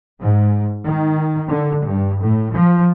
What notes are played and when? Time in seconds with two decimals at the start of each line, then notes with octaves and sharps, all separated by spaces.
0.21 G#2
0.86 D#3
1.49 D3
1.85 G2
2.22 A2
2.54 F3